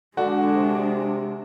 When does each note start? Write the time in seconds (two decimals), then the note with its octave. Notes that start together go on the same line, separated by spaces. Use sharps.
0.17 D3 G#3 D4 F#4
0.55 C3